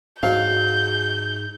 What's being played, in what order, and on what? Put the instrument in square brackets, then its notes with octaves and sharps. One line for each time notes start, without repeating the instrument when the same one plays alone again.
[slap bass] G#2 [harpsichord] F#3 [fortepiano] F5 [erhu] G6